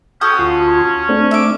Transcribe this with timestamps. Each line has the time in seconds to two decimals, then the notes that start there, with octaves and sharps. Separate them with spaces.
0.21 C#4 F#4 A4 G5 D#6
0.39 D2 F4 C6
1.09 A3 C4 D4
1.31 E5 D6